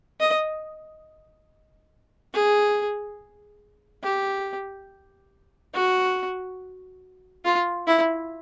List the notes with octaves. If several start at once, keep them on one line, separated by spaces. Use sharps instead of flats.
D#5
G#4
G4
F#4
F4
E4